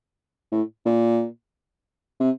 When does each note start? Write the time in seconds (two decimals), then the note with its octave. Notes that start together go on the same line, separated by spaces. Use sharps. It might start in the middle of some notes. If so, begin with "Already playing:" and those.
0.52 A2
0.86 A#2
2.20 C3